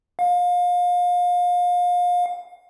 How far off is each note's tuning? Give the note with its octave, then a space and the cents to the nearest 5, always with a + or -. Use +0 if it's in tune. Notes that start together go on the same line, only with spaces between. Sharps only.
F5 +30